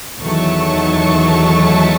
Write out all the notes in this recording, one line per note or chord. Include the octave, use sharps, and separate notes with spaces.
E2 D#3 F#3 A3 D#4 A5 C#6